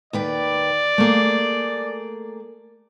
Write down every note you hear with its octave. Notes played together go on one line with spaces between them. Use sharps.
D#2 B4 D5 G5
A3 A#3 G#4